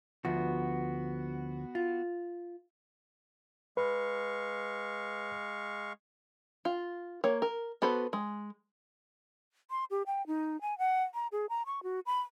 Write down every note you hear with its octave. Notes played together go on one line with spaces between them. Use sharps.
D2 F3 B3 F#4
F4
G#3 B4 F5 C#6
F4
A#3 C#5
A#4
B3 F#4 A4 B4 C5
G#3
C6
G4
G5
D#4
G#5
F#5
A#5
G#4
A#5
C#6
F#4
B5